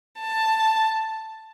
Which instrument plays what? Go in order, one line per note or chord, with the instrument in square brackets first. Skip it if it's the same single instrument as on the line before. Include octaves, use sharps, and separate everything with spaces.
[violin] A5